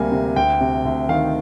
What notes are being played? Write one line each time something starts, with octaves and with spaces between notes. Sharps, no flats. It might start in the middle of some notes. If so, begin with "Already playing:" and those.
Already playing: D2 C3 G3 A#3 G#5
C3
D2 G5
C3
D2
D#3 F5